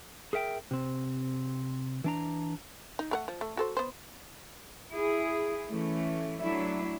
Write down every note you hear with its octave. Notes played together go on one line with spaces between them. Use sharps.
G#4 A#4 E5 G5
C3 C4
E3 D4 A#5
D#4
A3 A#4 F#5
F3
A3
F#4 A4 C5
B3 C5
E4 G#4
E3 A3 C#4
F#3 A3 D4 E4 E5